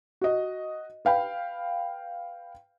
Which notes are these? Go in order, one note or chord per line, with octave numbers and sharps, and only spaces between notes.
F#4 D#5
B4 F5 G5 B5